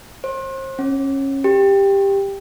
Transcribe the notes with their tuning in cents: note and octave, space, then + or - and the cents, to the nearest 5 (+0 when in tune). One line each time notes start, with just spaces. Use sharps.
C5 +35
C#4 -25
G4 +10